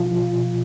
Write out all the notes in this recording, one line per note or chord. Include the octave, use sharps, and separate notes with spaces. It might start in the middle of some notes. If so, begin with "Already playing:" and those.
Already playing: B2 F3 F4
B2